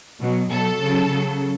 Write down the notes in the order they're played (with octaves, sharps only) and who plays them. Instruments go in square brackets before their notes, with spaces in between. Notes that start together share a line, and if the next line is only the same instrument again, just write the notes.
[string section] B2 F#3
B2 F#3 A4
C#3 F#3
C#3 F#3